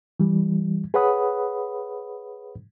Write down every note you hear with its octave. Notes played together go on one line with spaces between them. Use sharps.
E3 G3
G#4 B4 C#5 F#5 B5 D#6